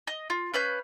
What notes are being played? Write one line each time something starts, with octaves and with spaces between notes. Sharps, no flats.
D#5
F4
C#4 B4 F5 G6